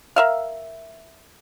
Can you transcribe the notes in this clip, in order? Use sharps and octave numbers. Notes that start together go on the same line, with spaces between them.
A#4 E5 F5